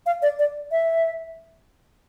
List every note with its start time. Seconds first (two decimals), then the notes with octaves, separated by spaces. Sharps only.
0.06 F5
0.22 D5
0.39 D5
0.71 E5